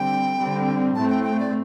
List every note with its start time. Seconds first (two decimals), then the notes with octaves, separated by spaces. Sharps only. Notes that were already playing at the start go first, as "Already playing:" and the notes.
Already playing: D3 G3 C4 G5
0.37 D3 G3 C4
0.95 A2 A3 C4 A5
1.09 G5
1.24 G5
1.39 D5